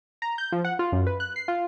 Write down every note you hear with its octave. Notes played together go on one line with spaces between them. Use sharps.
A#5
G6
F3
F#5
F4
F#2
B4
F#6
C7
F4